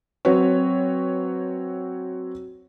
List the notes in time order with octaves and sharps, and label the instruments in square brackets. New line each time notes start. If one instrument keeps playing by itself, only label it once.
[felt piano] F#3 C4 F#4 B4 C#5